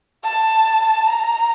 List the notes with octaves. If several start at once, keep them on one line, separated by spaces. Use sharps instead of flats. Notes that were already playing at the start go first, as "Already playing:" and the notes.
A5
A#5